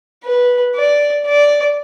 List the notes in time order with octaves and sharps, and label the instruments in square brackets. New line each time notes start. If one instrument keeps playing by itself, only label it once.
[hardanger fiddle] B4
D5
D5